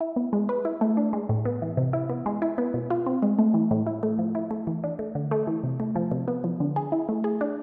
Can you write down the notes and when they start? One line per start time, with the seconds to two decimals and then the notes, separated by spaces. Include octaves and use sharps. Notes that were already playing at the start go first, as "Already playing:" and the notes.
0.01 E4
0.16 B3
0.33 G#3
0.49 B4
0.65 E4
0.81 A3
0.97 D4
1.13 G#3
1.29 A2
1.45 B3
1.62 E3
1.77 C3
1.93 E4
2.10 B3
2.26 G#3
2.42 E4
2.58 B3
2.74 B2
2.90 F4
3.06 C4
3.22 G#3
3.39 A3
3.54 E3
3.71 A2
3.87 E4
4.03 A3
4.19 F3
4.35 E4
4.51 A3
4.67 E3
4.84 D4
4.99 A3
5.15 D3
5.31 A3
5.47 E3
5.64 C3
5.80 A3
5.95 F3
6.12 C3
6.28 B3
6.44 F3
6.60 D3
6.76 G#4
6.92 E4
7.09 A3
7.24 G#4
7.41 D4